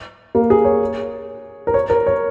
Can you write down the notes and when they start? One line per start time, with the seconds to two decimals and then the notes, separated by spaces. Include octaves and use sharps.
0.35 A#3
0.50 G#4
0.65 C#5
1.67 A#4
1.74 C#5
1.90 A#4
2.06 C#5